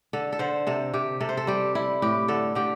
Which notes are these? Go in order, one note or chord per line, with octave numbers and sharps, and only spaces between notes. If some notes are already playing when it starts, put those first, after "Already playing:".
D3 A4
A4
D3 C5
C3 A4
C3 G4
C3 A4
C5
A4
G3 G4
G3 E4
A2 G4
D3 A4
D3 G4